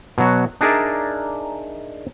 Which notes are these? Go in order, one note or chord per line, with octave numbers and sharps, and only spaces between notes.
B2 F#3 F#4
D4 D#4 G#4 A#4 D5 E5